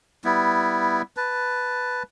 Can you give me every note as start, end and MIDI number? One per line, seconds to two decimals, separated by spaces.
0.24 1.02 55
0.24 1.02 59
0.24 1.02 64
1.17 2.03 71
1.17 2.03 81